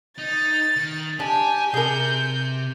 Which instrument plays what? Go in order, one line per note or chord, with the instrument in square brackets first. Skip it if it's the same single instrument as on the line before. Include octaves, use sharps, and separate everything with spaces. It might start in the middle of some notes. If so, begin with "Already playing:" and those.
[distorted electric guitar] D#4 [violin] A6
[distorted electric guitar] D#3
[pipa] D4 [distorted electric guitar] G4 [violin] G#5
[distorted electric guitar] C3 [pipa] G#4 A#4 [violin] G6